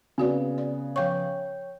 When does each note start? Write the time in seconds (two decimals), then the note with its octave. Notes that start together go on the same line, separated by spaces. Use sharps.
0.18 C#3 B3 C4 F#4 D5
0.58 D5
0.96 F3 C#5 F5 G5 C#6 G6